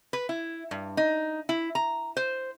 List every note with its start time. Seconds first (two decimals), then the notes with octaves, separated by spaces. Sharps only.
0.13 B4
0.29 E4
0.71 G2
0.97 D#4
1.49 E4
1.75 A#5
2.17 C5